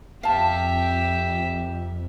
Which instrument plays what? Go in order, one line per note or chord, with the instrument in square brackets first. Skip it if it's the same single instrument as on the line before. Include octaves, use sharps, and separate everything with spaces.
[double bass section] F2 [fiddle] G4 E5 [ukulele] F5 A5